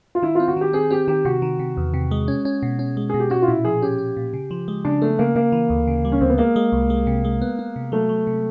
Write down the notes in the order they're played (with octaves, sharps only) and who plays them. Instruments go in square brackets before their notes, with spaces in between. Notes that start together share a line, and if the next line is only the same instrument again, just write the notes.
[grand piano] F4
[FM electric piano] D#3 [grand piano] E4
[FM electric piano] C4 [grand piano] F4
[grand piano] F#4
[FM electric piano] D#3 [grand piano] G4
[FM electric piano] C4 [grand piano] G#4
[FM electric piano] C4 [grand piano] G4
[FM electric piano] D#3 [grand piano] G4
[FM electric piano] C3 [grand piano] F#4
[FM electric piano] D#3
C3
E2
C3
G#3
C#4
C#4
B2
C#4
G#3
[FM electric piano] B2 [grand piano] G#4
[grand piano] G4
[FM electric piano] C#4 [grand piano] F#4
[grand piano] F4
[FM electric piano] A#2 [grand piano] E4
[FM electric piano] F3 [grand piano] G#4
[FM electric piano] C#4 [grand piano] G4
[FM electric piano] C#4
A#2
C#3
F3
G#3
[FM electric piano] C#3 [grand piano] D4
[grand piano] A3 [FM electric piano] B3
[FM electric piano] C#3 [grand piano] A#3
[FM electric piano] C#3 [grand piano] A#3
[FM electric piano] E3
D2
C#3
G3
[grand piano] C#4
[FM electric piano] D2 [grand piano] C4
[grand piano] B3
[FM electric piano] G#3 [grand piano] A#3
[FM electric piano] G#3
C2
G#3
C3
G#3
B3
B3
C3
[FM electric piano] F#3 [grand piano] A3
[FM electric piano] F#3
C3